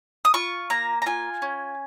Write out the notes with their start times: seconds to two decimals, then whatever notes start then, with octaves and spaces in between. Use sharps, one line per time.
0.25 D#6
0.34 F4 C#6
0.70 A#3 A#5
1.02 A#5
1.06 F4 G#5
1.42 C#4